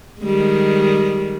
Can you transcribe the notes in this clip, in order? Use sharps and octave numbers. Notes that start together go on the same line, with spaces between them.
D#3 G3 G#3